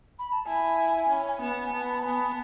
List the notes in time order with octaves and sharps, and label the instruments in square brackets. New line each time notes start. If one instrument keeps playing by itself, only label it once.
[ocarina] B5
A5
[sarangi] E4 [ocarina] G#5
[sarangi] C#4
B3
[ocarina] G#5
[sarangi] B3 [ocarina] A5
[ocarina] A5
B5
[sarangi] B3 [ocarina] G#5
[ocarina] A5